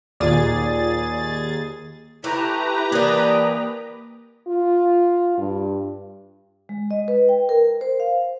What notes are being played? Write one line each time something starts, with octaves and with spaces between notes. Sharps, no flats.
D#2 A#2 F4 G#4 D5 A6
A3 E4 G4 B4 A#5
E3 A#3 D4 D#6
F4
G2
G#3
D#5
B4
G5
A#4
C5
F5